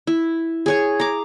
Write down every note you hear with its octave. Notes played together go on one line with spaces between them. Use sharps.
E4
G#4 C#5 G#5
A#5 D6